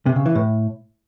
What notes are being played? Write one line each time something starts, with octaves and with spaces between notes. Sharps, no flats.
C3
C#3
E3
A2